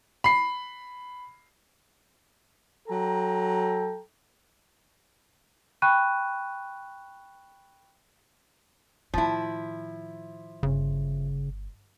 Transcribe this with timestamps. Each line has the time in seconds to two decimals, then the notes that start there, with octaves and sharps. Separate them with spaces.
0.24 B5 C7
2.88 F#3 A4 G5 A#5
5.82 G5 B5 C#6 F#6 D#7
9.14 A2 D#3 F3 E4
10.63 G1 C#3